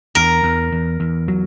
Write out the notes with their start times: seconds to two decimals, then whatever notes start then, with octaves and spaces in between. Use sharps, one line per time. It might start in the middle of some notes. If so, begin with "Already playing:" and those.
0.15 E2 A#4
0.43 E2
0.73 E2
1.00 E2
1.28 F#3